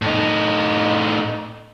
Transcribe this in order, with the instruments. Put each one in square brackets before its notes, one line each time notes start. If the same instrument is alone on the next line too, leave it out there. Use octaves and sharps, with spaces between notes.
[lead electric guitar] A2 D#4